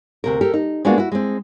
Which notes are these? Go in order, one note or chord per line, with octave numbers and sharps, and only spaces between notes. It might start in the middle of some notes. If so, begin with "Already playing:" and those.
D2 C3 A#4
G4 A4 A#4
D#4
G#3 A#3 B3 D4 F4 F#4
E4 F#4
G#3 C4